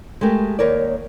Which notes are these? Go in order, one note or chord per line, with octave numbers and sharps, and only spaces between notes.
G#3 A3 G4 A#4
D#2 A#4 C#5 D5